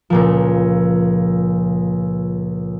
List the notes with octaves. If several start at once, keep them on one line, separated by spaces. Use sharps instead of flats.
C#2 A#2 F3